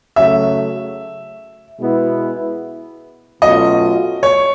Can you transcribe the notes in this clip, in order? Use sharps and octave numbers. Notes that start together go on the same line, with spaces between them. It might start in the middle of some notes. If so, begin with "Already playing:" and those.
C#3 F#3 A3 E5
B2 G#3 B3 E4
B2 F#3 A3 C#4 F4 D#5
C#5